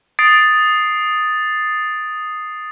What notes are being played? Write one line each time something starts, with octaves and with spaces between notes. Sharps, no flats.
D#6 A6 C7 D7